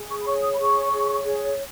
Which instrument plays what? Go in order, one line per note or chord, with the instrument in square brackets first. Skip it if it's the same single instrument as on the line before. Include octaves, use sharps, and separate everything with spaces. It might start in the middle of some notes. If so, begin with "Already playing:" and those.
Already playing: [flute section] G#4
C#6
B5
C#5 C#6
D#6
B5
G#4 C#6
C#5
G#4